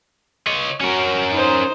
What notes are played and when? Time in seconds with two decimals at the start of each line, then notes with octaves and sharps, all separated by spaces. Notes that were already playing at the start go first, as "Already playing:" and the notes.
0.47 C#5 D#5
0.81 C#4 F#4 A#4
1.31 D#4 C5